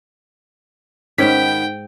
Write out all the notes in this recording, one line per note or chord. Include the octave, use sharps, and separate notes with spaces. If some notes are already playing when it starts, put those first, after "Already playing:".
G#2 D#3 B3 C#4 G5 B6